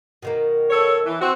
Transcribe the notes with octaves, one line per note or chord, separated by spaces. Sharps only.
B2 D#3 A#3
A4 C#5
E3
C4 F#4